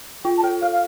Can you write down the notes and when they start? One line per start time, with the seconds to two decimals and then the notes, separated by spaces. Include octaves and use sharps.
0.24 F4 G5
0.37 A5
0.43 A4 G5
0.62 A4 F5
0.72 F5